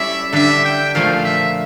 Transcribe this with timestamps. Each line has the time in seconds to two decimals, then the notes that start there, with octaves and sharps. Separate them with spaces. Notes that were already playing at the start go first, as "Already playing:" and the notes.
Already playing: G3 C#4 E4 A4 D5 E5
0.33 D3 G3 D4 E5
0.64 G5
0.95 A#2 F3 A3 F5
1.25 E5